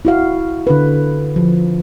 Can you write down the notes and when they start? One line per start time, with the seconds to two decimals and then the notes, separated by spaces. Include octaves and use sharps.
0.05 E4 F#4 F5
0.67 D3 B4
1.36 F3